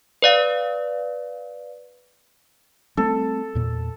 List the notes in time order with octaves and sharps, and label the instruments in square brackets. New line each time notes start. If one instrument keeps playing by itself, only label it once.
[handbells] B4 D5 F5
[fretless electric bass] G3 A3 C4 [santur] A4
[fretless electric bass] E2 A#2